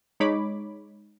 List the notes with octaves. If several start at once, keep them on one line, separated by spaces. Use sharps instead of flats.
G#3 D#4 C#5 B5 D6